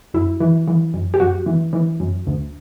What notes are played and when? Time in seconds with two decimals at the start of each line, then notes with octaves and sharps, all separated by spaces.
0.14 F#2 E4
0.40 E3
0.68 E3
0.94 F#2
1.14 G4
1.20 F#2 F#4
1.46 E3
1.73 E3
2.00 F#2
2.27 D2